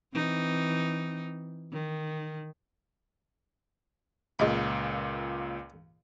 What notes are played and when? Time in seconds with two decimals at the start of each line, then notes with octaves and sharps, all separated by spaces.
0.15 E3 C4 D#4
1.73 D#3
4.39 C#2 A#2 G#3 B5